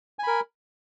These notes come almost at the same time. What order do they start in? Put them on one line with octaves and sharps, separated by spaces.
G#5 B5 A#4